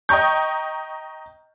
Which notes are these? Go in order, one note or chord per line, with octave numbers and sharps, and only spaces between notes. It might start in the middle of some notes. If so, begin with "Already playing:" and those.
D#5 G5 A#5 C#6 G6